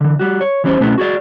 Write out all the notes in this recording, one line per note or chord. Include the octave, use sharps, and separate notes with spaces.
D3 E3
G3 F#4
C#5
E3 G3 C#4 C5
B2 A3 B3 C#4 E4
F#4 G#4 D5